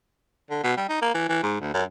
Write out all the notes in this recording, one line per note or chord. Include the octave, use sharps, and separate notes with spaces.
D3
B2
G3
D#4
A#3
E3
E3
G#2
D2
F#2